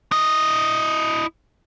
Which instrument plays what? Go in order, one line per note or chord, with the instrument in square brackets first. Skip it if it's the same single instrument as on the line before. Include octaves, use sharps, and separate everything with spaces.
[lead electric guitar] E4 D#5